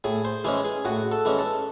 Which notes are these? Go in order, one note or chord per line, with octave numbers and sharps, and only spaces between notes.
A2 G#4
C5
E3 G#3 C#4 G#4
G#4
A2 F#4
A4
E3 G#3 C#4
A4